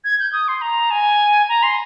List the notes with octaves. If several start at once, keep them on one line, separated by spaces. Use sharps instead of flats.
G#6
G6
D#6
C6
A#5
G#5
A#5
C6